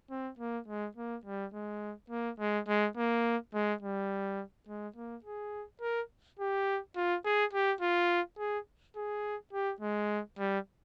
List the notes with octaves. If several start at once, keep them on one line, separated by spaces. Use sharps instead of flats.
C4
A#3
G#3
A#3
G3
G#3
A#3
G#3
G#3
A#3
G#3
G3
G#3
A#3
G#4
A#4
G4
F4
G#4
G4
F4
G#4
G#4
G4
G#3
G3